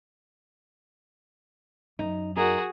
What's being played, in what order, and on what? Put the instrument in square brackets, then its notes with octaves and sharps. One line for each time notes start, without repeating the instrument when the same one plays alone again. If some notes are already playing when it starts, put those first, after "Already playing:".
[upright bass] F#2 [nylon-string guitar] D#4
[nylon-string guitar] D#4 A#4 [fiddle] F#4 G#4